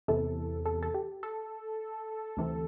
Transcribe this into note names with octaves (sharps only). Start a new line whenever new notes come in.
E2 C3 E3 A4
A4
A4
G4
A4
D2 C3 E3